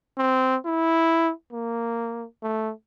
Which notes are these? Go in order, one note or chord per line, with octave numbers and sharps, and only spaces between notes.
C4
E4
A#3
A3